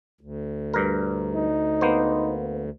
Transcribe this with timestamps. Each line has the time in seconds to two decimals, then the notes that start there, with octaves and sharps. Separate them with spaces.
0.21 D2
0.74 G2 A#4
1.35 D#4
1.81 A#3 B3 C5